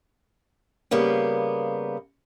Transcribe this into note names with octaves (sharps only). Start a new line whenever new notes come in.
C#3 G3 A#3 B3